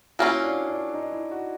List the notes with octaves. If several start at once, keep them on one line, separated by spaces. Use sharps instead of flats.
F#3 A#3 C#4 E4 F4
D4
D4
D#4
E4
F#4